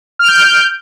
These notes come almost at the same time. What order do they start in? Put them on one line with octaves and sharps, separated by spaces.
F6 D7 G6